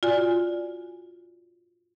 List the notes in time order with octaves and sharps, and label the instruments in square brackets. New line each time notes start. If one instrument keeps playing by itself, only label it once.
[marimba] F4 F#4 D5 G#5